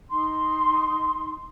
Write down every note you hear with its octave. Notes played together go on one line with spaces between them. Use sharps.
D#4 C6